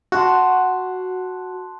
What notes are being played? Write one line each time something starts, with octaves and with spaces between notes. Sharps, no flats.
F#4 F#5 A5 C6